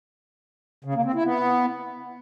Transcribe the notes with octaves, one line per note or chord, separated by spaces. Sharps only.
C#3
A#3
C4
E4
B3